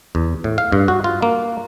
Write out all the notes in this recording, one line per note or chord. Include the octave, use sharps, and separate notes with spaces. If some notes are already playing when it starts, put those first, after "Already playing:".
E2
A2
F5
G2
F#4
F4
A#3